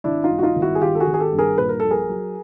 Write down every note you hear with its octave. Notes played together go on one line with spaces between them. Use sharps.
G#1 D4 E4
D#4 F4
G2
F#4
D#4 F4
G#1
E4 F#4
G#4
D#3 F4 G4
A4
F#4 G#4
G#1
G#4
G4 A4
G2
G#4 A#4
A#2 B4
A#4
A#1 A4
G#4 A#4
F#3